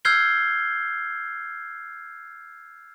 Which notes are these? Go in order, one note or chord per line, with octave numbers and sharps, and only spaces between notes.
E6 F6 G6 G#6 C7 G7